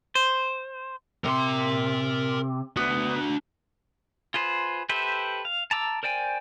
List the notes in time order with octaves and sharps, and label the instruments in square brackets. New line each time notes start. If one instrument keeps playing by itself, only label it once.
[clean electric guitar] C5
[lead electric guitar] C3 [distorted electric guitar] A#4 C6
[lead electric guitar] B3 [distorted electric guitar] D4 F#4
[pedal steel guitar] F4 G#4 B4 C5
G4 A4 B4 C5 E5
F5
A5 A#5 D6 E6
A#4 C5 D5 G5 G#5